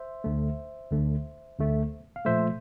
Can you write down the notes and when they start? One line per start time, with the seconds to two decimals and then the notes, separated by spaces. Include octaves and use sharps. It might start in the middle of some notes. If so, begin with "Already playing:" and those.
Already playing: C5 E5
0.24 D2 D3 A3
0.91 D2 D3 A3
1.59 D2 D3 A3
2.16 F5
2.25 A#2 F3 A3 C5 E5